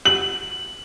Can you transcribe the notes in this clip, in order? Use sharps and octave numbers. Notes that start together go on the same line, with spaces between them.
F#7